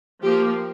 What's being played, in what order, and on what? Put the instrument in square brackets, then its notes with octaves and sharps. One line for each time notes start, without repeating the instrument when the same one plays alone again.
[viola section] F3 A#3 G4